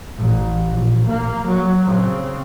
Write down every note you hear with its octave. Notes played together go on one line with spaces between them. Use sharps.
A1
A#1
A#3
F#3
C#3 C4